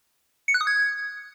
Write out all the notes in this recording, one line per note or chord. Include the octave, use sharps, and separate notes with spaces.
C#7
F#6
D#6
G#6